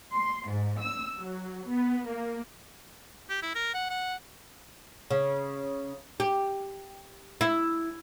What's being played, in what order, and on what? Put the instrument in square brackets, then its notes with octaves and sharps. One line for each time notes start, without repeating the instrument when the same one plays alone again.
[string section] C6
G#2
E6
F#3
B3
A#3
[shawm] G4
E4
A#4
F#5
F#5
[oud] C#3
G4
E4